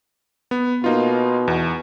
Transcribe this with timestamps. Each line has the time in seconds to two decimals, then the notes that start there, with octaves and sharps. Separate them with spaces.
0.51 B3
0.84 B2 A#3 D#4 F4
1.48 E2